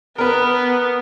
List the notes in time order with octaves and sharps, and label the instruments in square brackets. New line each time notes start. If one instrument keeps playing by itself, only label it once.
[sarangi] B3 [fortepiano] A#4 B4